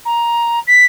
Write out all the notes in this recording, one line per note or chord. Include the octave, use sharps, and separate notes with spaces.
A#5
B6